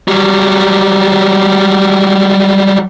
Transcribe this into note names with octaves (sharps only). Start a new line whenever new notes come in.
F#3 G3